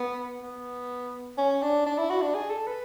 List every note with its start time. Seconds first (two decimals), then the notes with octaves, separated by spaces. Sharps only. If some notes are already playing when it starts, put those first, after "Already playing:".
Already playing: B3
0.42 B3
1.38 C#4
1.62 D4
1.86 D4
1.98 E4
2.10 F#4
2.22 D4
2.34 G#4
2.50 A4
2.67 B4